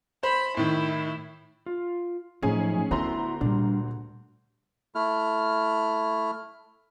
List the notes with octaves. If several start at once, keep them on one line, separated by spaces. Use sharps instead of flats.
C5 B5
A2 D#3 E4
F4
A2 F3 F#3 C#4 D#4 G#4 G#5
D2 A3 B3 E4 A4 A#5 C6
A#2 G3 D4
A3 E4 F6